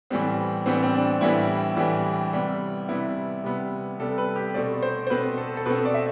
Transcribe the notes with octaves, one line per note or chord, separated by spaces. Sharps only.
A2 E3 G3 B3 C4
A2 E3 G3 B3 C4
C4
D4
A2 E3 G3 B3 E4
A2 E3 G3 B3
C3 G3 B3
C3 G3 B3 E4
C3 G3 B3
C3 G3 B3 A4
B4
G4
B2 A3 C4 D5
C5
C5
B2 A3 C4 B4
A4
A4
B2 A3 C4 B4
D5
E5